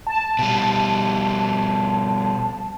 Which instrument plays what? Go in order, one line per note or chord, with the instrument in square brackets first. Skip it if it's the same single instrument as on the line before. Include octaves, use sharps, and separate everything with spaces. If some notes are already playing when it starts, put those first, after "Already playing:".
[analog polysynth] A5
[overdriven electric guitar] B2 G3